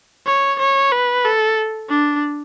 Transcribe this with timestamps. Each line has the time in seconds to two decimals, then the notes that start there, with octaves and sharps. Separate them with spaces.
0.27 C#5
0.59 C#5
0.92 B4
1.25 A4
1.89 D4